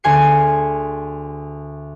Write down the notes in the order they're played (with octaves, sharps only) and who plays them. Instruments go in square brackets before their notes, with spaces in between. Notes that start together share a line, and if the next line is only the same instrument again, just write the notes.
[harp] D2 G#4 G#5 C6 G#6 C#7